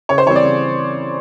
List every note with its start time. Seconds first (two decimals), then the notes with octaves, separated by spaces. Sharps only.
0.09 C#3 C#5
0.18 C5
0.26 E3 G3 C4 C#5
0.36 D5
0.44 C#3